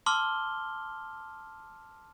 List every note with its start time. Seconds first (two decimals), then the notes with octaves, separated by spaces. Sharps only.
0.06 A5 C6 D6 E6 F6 G7